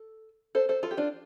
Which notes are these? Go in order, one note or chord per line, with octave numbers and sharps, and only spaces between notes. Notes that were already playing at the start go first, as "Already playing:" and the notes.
Already playing: A4
A4 C5
A4 C5
F4 A4
G4
D4 F4